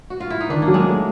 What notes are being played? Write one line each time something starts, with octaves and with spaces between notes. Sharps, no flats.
F#4
F4
E4
D#4
D#3 D4
A#3
F#3
G#3
A3